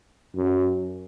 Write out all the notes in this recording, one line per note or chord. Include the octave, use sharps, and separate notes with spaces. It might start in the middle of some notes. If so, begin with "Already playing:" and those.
F#2